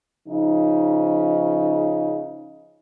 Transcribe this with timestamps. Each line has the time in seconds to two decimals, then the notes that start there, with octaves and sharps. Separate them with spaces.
0.29 C#3 F3 D#4